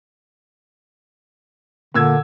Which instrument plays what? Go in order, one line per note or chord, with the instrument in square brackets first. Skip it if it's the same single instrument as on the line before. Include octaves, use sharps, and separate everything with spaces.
[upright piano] A#2 E6 G#6 [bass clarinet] D3